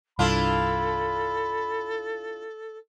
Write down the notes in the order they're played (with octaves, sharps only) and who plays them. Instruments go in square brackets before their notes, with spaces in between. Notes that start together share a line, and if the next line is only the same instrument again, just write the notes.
[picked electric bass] C2 G2 [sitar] D4 E4 F4 [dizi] A4 [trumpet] B5